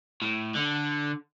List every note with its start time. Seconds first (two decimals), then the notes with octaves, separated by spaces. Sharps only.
0.22 A2
0.55 D3